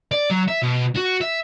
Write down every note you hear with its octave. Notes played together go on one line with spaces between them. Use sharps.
D5
F#3
E5
B2
F#4
E5